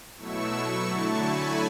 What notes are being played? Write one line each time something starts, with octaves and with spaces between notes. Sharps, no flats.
B2 F#3 A3 E4 C#6 E6
C#6 E6
D3 F#3 A3 E4 A5 C#6
G#5 B5